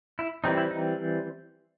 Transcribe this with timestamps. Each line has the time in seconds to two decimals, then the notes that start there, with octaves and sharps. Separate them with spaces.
0.19 E4
0.44 E3 G3 C4 D#4
0.57 E4
0.71 D#4